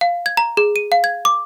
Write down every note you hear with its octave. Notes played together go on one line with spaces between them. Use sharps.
F5
G#6
A#5
G#4
D#7
F5
G#6
D6